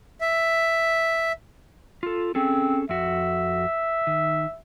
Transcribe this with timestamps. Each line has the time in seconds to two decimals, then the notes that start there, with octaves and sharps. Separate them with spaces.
0.21 E5
2.03 F4 A4
2.35 C4 C#4 G#4 A4
2.89 F2 F#4 E5
4.07 D#3